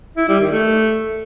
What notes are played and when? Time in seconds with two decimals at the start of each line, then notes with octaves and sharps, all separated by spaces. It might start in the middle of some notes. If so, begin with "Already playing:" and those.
0.17 E4
0.29 G3
0.40 D#3
0.52 A3